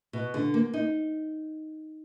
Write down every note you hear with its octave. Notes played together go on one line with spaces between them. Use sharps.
B2
D3
A#3
D#4